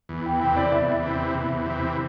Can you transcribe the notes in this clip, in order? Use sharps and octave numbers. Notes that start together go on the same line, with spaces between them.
E2
G5
C3 E3 G5
D5
E2 E5
C3 E3
E2
C3 E3